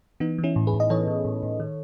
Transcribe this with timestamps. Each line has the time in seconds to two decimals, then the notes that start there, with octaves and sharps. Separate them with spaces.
0.20 E3 B3 D#4
0.38 E3
0.44 C#4 E4
0.56 A2
0.67 G#4 B4
0.74 A2
0.80 D#5
0.90 E3 A4 C#5
1.08 E3
1.25 A2
1.43 A2
1.60 D#3